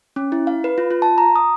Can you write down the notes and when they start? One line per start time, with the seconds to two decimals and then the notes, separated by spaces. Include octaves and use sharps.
0.16 C#4
0.32 E4
0.47 F5
0.64 B4
0.78 F4
0.91 F4
1.02 A5
1.18 A#5
1.36 D#6